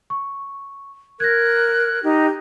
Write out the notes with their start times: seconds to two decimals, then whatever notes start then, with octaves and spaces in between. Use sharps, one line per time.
0.10 C#6
1.20 A#4 F#6 G#6 A#6
2.03 D#4 G4